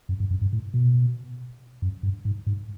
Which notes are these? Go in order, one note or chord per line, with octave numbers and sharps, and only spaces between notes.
F#2
G2
F#2
G2
A2
B2
F#2
G2
G#2
G#2